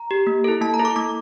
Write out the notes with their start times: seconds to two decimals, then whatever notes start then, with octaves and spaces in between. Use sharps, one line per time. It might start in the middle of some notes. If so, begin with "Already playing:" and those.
Already playing: A#5
0.11 G4
0.27 A#3
0.44 E4 A4
0.61 A#3 A5
0.74 A#5
0.79 E4 A4
0.85 D6
0.96 A#3 D6